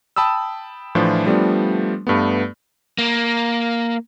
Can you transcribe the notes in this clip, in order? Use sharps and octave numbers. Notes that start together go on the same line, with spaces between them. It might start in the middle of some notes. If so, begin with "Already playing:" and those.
G5 A5 B5 D#6 E6
A2 E3 F3 D4 F4
F3 G3 A3 B3 D4
G2 A3 B3
A#3